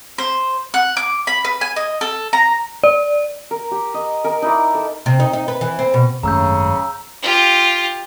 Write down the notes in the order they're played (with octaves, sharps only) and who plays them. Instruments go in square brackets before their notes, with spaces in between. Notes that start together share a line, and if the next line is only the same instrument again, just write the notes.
[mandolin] C5
F#5
D6
B5
B4
G#5
D#5
A4
A#5
[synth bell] D5
[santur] A#4
G4
D#5
A#4 G#5
D#4 E4 D5
A4
[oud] C3
D#4
D#4
B4
E3
C4
B2
[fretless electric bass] G#1 F#2 A3 [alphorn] C#3 [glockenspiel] A#5 E6 G6
[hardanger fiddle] F4 G4